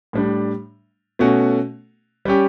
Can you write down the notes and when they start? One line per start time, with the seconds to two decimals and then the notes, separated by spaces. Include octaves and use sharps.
0.13 A2 G3 D4
1.19 B2 A3 C#4 F#4
2.25 G3 C#4 G4